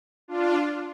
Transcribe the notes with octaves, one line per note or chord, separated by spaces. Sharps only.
D4 F4